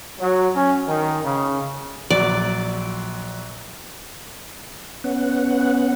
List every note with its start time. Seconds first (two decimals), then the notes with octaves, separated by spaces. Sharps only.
0.19 F#3
0.55 C#4
0.88 D#3
1.24 C#3
2.10 A#1 F#3 D5
5.04 B3 C#4 F#5